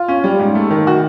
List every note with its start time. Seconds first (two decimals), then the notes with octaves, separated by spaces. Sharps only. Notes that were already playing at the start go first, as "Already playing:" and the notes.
Already playing: F4
0.08 C#4
0.24 G3
0.39 G#2
0.55 A3
0.71 D#3
0.87 F#4